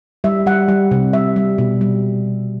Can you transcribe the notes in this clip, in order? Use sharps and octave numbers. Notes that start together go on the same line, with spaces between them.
G3 E5
G3 F#5
G3
C3
G3 E5
G3
B2
G3